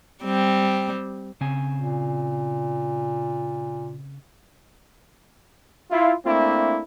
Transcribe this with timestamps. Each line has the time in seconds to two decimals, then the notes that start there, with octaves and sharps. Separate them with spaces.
0.24 G3 C4
1.41 C#3 C4 G#5
1.78 A#2
5.91 E4 F4
6.25 A3 A#3 C4 D4 E4